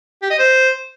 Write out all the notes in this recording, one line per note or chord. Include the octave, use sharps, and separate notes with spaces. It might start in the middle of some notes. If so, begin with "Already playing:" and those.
G4
D#5
C5